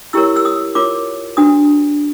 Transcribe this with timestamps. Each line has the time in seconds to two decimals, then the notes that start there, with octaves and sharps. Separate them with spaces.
0.13 E4 G4 A#4 C#5 E6
0.36 E6
0.45 D#6
0.75 F4 A#4 C#5 D6
1.37 D4 F#4 B4 D#6